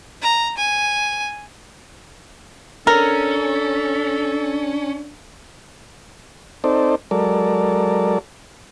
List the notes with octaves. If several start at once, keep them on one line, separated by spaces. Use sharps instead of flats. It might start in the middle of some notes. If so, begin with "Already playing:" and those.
A#5
G#5
C#4 D4 A4 A#4
C4 D#4 A4 C5 D5
F#3 G#3 A4 A#4 D5